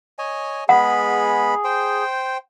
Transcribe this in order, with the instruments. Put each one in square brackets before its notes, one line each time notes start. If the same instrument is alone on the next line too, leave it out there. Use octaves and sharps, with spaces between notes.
[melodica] C#5 D#5 G#5
[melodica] G#3 B3 B5 [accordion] G#4 [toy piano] F#5
[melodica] C5 G5